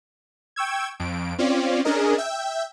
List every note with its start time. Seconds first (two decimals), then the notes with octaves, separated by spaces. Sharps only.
0.56 G5 C#6 E6 G#6
1.00 F2 D7
1.39 C4 C#4 F4 D5
1.85 C#4 D4 G#4 A#4 D#5
2.18 E5 G5